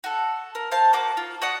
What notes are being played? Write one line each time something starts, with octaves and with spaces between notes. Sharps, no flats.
F#4 A4
A#4
C5 F5 A5
A#3 F#4 D6
F4
F#4 D5 F#5 D#6